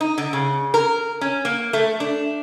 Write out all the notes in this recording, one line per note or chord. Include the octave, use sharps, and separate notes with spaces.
D#4
D3
C#3
A#4
C#4
A#3
A3
D4